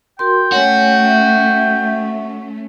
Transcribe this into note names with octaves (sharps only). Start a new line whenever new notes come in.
F#4 A#4 G5 C6
A3 C#4 F#4 C#5 G#5
E5